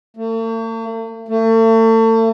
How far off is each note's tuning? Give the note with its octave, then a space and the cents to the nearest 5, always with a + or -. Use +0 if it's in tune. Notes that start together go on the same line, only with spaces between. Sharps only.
A3 +45
A3 +40